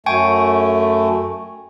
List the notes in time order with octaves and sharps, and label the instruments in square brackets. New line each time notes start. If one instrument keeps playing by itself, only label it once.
[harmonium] F#2 A3 [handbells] G5 G#5 C#6